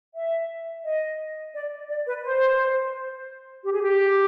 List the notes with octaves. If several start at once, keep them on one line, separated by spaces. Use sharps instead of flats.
E5
D#5
D5
D5
B4
C5
G4
G#4
G4